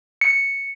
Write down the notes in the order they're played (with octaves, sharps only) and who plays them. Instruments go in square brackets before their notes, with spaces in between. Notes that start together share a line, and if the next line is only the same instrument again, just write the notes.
[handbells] C#7